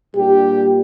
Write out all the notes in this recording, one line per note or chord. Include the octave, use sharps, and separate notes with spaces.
A#2 G3 D4 G4